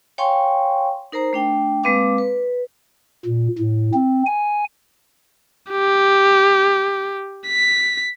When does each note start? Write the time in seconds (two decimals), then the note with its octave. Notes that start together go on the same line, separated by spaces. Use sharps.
0.18 C#5 F5 G5 G#5 C6 C#6
1.12 D#4 A#4 C5 A#5
1.33 A3 D4 G5
1.84 G#3 A#3 C4 B4 F5 D6
2.18 B4
3.25 A#2
3.58 A2
3.93 C4
4.26 G#5
5.71 G4
7.47 B6